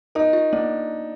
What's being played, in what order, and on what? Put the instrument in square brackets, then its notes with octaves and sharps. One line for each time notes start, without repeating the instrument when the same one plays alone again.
[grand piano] D#4 [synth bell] A#4
[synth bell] F4
[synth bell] A#3 [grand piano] D4